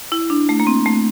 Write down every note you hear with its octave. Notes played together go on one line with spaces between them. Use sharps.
E4
D4
A3
A#3
C4
A3